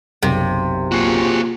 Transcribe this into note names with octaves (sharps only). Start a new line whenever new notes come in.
F#1 B1 C3
A#2 F#4 G#4